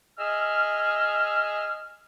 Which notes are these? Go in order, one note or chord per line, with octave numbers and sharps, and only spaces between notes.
G#4 D#5 E5 E6 F6